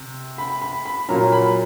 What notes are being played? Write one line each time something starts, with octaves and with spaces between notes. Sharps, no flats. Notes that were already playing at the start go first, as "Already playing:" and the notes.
Already playing: C3
B5
B5
B5
A#2 F#3 A#3 A#5
B5